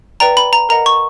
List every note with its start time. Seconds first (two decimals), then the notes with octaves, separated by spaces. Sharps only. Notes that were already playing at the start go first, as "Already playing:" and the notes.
0.20 B4 D5 G5 A#5
0.37 B5
0.53 A#5
0.69 A#4 D#5 F#5 A#5
0.86 C#6